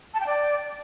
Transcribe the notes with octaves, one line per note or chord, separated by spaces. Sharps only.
A5
G5
D5